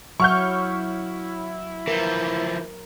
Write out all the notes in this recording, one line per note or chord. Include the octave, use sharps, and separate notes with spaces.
F#3 E4 F#5 C#6 F6 G6
E3 F3 A#4